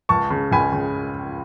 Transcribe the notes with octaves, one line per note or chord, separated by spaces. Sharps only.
C#2 A5 C#6
C#3
C#2 G#5 B5
C#3